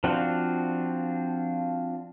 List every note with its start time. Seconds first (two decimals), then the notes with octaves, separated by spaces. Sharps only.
0.04 F3 C4 D4 F4 F#4